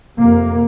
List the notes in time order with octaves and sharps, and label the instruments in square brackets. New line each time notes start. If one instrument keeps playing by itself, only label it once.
[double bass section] F2 C3 A#3